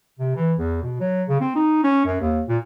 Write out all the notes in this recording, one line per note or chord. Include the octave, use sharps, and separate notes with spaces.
C3
E3
E2
B2
F#3
C#3
C4
D#4
C#4
F#2
D#2
A#2